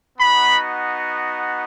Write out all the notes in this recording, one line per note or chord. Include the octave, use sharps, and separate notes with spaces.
B3 D#4 F#4 B5